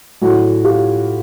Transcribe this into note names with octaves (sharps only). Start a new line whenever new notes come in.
A2 F#3 E4 F#4
F4 G4